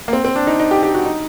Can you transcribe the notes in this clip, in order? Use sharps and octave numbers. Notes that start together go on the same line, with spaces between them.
A#3
C4
C4
D4
D#4
D#4
G4
G4
F#4
D#4